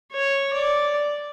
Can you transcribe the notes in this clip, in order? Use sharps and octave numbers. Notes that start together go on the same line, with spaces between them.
C#5
D5